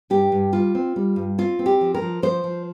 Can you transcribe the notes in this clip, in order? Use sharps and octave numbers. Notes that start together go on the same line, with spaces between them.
G2 G4
G2
G3 F4
C4
G3
G2
C4 F4
C4
G4
F3
A#4
F3
F3 C5
F3